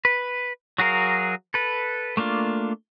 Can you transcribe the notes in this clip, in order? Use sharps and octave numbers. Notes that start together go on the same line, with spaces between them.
B4
F#3 F#4 G#4 A#4 F5
A4 B4
A3 A#3 D4 F4